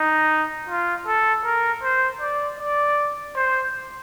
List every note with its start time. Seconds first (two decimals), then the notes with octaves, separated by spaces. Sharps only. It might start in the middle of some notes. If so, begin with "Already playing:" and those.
Already playing: D#4
0.69 F4
1.07 A4
1.45 A#4
1.83 C5
2.21 D5
2.59 D5
3.36 C5